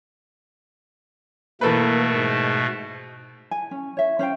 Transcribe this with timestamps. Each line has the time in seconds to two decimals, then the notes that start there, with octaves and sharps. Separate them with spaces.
1.61 B2 E3 A3 A#3 A4 B4
2.14 G#2
3.51 G#5
3.71 C#4
3.97 C#5 E5
4.19 C#4 C5 F5 G5